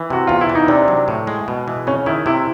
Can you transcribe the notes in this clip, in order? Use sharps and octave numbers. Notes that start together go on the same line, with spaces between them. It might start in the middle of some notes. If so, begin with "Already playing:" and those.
Already playing: E3
C3 F#4
E2 F4
E4
E3
D#4
C3 D4
F#3
A2
G#3
B2
E3
C#3 C#4
D#3 E4
C3 E4